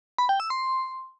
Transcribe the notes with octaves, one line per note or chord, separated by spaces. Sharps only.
B5
G5
E6
C6